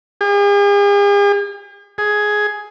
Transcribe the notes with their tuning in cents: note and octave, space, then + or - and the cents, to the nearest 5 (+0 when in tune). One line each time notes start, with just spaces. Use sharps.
G#4 -45
G#4 +10